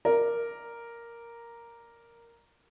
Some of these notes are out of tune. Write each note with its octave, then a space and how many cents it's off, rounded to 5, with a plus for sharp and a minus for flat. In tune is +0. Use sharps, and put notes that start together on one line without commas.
A#4 +0 D5 +0